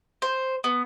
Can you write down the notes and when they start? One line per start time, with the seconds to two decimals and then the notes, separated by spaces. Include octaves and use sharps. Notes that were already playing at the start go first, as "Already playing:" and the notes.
0.22 C5
0.64 B3